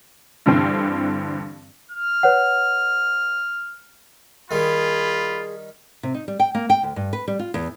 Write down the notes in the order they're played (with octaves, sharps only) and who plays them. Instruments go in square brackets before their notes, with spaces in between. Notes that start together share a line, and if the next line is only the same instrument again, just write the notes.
[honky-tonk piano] G2 D3 E3 C4
[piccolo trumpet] F6
[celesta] B4 C#5 F#5
[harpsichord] D#3 G3 [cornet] F4 [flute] G#4 [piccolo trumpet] B5
[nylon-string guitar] C3
D#4
G3
G5
A#3
G5
D2
G2
B4
G3
F4
E2